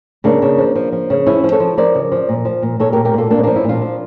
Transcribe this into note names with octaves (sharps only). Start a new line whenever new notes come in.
C#3 A#3 D4
C#3
F3
F3
F3
C#3
F3 C#4 E4
F3
A4 C#5
F3
F3 A#4 D5
C#3
F3
A#2
F3
A#2
A#2 A4 C#5
A#2 G4 A#4
G4 A#4
A#2 F4 A4
A#2 A#3 D4
C#4
F3 A#3 D4
C#4 E4
A#2 D4 F4
F3